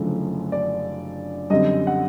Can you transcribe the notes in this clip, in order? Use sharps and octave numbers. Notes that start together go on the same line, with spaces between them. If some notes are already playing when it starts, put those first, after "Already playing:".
Already playing: F#1 F#2 D3 F3 A3
D5
F#2 D3 G3 C4 D#5
F#5